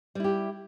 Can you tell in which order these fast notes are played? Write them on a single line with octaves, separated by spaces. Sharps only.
G3 E4 G4